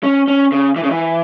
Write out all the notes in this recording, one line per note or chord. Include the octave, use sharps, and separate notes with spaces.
C#4
C#4
C#3
E3
C#3
E3